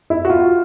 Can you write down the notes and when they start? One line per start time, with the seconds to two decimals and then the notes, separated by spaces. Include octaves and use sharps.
0.10 E4
0.25 F#4
0.30 F4